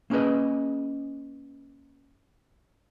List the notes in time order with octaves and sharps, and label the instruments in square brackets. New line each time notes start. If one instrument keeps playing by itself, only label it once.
[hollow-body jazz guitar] A#3 C#4 G#4 B4 D#5